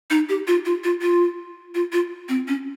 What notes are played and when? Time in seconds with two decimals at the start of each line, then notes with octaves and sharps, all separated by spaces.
0.10 D#4
0.29 G4
0.47 F4
0.65 F4
0.84 F4
1.02 F4
1.75 F4
1.92 F4
2.29 C4
2.48 C#4